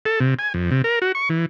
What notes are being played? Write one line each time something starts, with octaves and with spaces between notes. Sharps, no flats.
A4
C3
G#5
F2
C3
A#4
F#4
C#6
E3